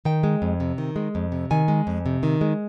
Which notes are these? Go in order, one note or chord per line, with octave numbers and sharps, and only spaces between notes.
D#3 G5
G#3
F2
C3
D#3
G#3
F2
C3
D#3 G#5
G#3
F2
C3
D#3
G#3